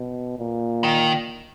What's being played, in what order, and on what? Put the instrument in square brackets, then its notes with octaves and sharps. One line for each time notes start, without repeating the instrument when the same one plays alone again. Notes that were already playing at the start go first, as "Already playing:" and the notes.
Already playing: [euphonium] B2
A#2
[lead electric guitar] D#3